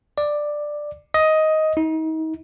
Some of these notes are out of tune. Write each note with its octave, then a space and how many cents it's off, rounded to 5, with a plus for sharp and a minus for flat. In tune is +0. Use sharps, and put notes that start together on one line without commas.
D5 +10
D#5 +10
D#4 +35